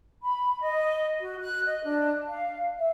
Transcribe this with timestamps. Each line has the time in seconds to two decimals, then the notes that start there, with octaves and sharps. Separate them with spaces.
0.22 B5
0.62 D#5
1.20 F#4
1.41 F#6
1.67 D#5
1.83 D4
2.27 F5
2.78 E5